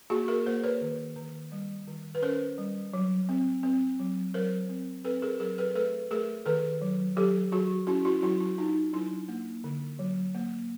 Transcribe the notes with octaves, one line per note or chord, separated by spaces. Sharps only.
A#3 F#4 G#4
G#4 A#4
A#3 A#4 C5
B4 C#5
D#3
D#3
G3
D#3
B4
C#4 A#4 C5
G3
F#3
C4
C4
F#3
F#3 A#4 C5
C4
C4 A4 B4
G#4 A#4
F#3 G#4 A#4
A4 B4
A3 A4 B4
A3 G#4 A#4
D#3 A4 B4
F#3
F#3 G4 A4
F#3 F#4 G#4
C#4 E4 F#4
E4 F#4
F#3 E4 F#4
E4 F#4
D4 D#4 F4
F#3 D4 E4
A#3
D3
F#3
A#3